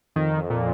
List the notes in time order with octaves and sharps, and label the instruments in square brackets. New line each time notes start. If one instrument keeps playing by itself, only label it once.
[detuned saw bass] F2 [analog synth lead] D#3
[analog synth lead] A#2